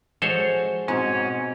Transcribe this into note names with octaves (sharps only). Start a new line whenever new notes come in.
F3 G#3 F#4 A4 C5 C#5
G#2 B2 C4 C#4 F#4